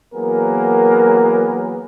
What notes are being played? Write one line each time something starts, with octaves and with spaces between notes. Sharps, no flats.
E3 F#3 A#3 B3 G#4 A#4